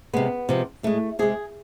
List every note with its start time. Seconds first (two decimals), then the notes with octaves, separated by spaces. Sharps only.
0.13 C3 G#3 B3
0.49 C3 F3 G#3
0.83 A2 G#3 A3
1.19 C3 G#3 G#4